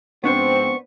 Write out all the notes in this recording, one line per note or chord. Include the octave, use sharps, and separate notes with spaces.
G#2 F3 B3 C4 D4 C5 C#6